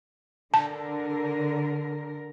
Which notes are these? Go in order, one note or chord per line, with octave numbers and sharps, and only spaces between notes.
D3 A#4 A5